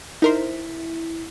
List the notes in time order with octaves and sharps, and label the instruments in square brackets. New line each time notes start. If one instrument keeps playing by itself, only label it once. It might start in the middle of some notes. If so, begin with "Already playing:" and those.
[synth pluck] D#4 A#4 C5 [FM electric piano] E4